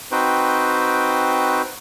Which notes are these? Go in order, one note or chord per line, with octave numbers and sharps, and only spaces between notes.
C4 D#4 F#4 B4 C5 G5